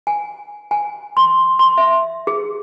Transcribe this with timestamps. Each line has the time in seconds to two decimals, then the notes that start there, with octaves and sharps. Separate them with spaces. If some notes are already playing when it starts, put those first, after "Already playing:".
0.07 G#5
0.71 G#5
1.17 C6
1.59 C6
1.78 E5
2.27 G#4